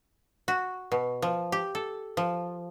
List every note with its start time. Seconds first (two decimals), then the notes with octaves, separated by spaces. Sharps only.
0.48 F#4
0.92 B2
1.22 F3
1.52 G4
1.75 A4
2.17 F3